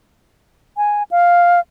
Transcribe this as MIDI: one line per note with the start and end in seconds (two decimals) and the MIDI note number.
0.77 1.03 80
1.11 1.60 77